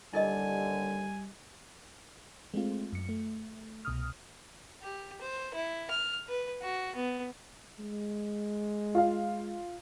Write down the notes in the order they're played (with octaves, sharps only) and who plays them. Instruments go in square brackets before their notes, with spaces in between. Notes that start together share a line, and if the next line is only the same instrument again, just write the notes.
[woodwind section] D#2 D3 [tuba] G3 [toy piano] E4 A#4 D#5 [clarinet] G#5
[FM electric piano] G#3 A3 C4 F4
F#2 C#7
A3
C2 B2 D#6 F6
[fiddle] G4
C5
E4
F6
B4
F#4
B3
[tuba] G#3
[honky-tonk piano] F4 F5